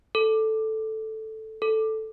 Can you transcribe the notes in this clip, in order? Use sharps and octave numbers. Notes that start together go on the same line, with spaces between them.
A4
A4